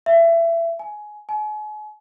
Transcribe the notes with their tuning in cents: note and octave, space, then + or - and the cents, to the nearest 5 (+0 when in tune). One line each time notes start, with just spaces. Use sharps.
E5 +25
G#5 +15
G#5 +40